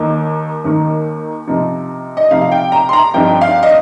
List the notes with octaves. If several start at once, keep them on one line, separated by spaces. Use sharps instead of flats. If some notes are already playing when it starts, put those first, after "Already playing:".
Already playing: D#2 D#3 A#3 D#4
D#2 D#3 A#3 D#4
C3 F3 D#4
D#5
C3 F3 D#4 F5
F5
G5
A#5
C6
A#5
G2 F3 C4 D#4 G5
F5
D#5